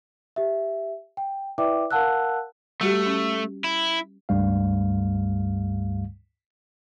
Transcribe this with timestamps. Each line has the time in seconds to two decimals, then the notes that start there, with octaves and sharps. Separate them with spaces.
0.36 G4 E5
1.17 G5
1.58 E4 B4 D5 E5 G5 D6
1.91 A#4 F5 F#5 A5 E6 F#6
2.81 G3 A3 F#4 G4
3.06 C#4
3.64 E4
4.29 C#2 G2 G3 A3 F5